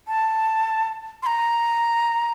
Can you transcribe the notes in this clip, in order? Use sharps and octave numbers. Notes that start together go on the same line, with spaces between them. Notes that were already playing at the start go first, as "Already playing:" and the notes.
A5
C6
A#5